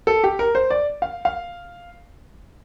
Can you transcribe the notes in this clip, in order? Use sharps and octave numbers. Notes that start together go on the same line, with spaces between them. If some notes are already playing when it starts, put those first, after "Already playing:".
A4
G4
A#4
C5
D5
F5
F5